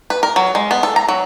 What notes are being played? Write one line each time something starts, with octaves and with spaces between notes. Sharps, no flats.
B4
A#4
F#3
G#3
B3
A4
A#5
F#3